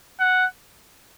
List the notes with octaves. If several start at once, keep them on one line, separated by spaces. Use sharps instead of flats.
F#5